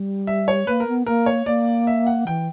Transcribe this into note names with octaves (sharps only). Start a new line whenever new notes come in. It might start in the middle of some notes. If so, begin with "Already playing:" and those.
Already playing: G3
E5
C#5
A#3 B4
A#4
B3
A#3 A#4
C#5
A#3 D5
E5
F#5
E3 G5